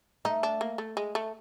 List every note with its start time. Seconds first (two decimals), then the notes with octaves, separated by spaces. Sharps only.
0.25 A3 D#4
0.43 D4
0.61 A#3
0.78 A3
0.97 G#3
1.15 A3